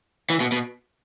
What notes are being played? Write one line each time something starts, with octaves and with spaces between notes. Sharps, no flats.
E3
B2
B2